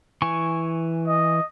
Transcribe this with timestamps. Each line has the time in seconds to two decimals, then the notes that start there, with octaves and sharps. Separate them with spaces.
0.22 E3 G#5 C#6
1.07 D#5